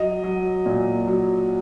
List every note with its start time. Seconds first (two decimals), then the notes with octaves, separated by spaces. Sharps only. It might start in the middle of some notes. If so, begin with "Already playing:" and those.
Already playing: F#3 D#5
0.24 F#3
0.66 A#2
1.07 F#3